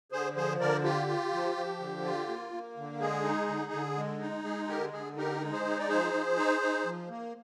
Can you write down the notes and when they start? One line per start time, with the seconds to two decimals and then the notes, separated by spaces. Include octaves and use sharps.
0.12 D3 G#4 C5
0.36 F3 G#4 C5
0.60 D3 A#4 D5
0.84 F4 G4
1.08 F4
1.33 F3
1.56 F3
1.80 D3
2.04 F4
2.29 A#3
2.53 A#3
2.77 D3
3.00 G#3 G#4
3.24 D#4
3.48 D3
3.72 D3
3.97 G#3
4.20 D#4
4.44 G#3 G#4
4.68 D3 G4 A#4
4.92 D3 G#4
5.17 D#4 G4 A#4
5.41 G#3
5.53 G#4 C5
5.65 D#4
5.79 D5
5.88 F3 G#4 C5
6.13 F3
6.37 D#4
6.61 D#4
6.85 F3
7.09 A#3